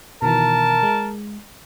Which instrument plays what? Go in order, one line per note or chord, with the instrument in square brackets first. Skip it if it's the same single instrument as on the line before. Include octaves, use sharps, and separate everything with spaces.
[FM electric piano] B2 D#3 E3 [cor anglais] A#4 [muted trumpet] A5
[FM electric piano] G#3